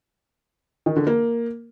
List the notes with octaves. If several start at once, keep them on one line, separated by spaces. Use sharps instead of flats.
D#3
D3
A#3